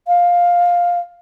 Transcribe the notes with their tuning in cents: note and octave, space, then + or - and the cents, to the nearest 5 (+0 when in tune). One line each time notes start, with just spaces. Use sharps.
F5 +10